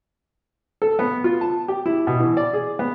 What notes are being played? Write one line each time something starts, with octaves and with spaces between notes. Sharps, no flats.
A4
B3
F4
A5
G4
E4
B2
E3
D5
G#4
B3